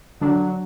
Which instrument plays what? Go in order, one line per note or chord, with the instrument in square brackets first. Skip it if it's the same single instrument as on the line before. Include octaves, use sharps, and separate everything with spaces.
[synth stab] D3 D4 [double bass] F#3